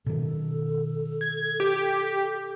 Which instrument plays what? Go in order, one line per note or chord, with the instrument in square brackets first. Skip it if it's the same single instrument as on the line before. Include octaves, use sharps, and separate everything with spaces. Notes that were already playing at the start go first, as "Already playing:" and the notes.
[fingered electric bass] B2 D#3 [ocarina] A4
[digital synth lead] G#6
G4